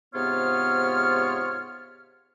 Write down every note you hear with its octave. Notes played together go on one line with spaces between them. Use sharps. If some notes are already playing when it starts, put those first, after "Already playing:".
G#2 C3 B3 F4 C#5 F6